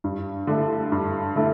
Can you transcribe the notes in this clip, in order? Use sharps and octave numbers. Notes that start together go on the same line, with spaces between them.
G2
D3 A3 E4 A4
G2
D3 A3 E4 A4